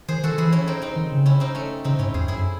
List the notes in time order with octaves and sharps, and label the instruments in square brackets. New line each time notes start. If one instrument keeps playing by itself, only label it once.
[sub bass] D#3 [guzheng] G#4 C5
[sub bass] D#3 [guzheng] F#4 A4
[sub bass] E3 [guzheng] E4 G#4
[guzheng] C#4 E4
C4 D#4
C4 D#4
[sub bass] D#3
C#3
[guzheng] C#4 E4
C4 D#4
A3 C#4
[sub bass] C#3 [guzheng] C4 D#4
[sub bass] G#2 [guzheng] C#4 E4
[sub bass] E2 [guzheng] G#4 C5
[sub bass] F#2 [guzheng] E4 G#4